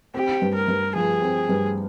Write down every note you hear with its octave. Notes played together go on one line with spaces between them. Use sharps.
C4 G4
G2
A#4
G2
F3 G#4
C4
G2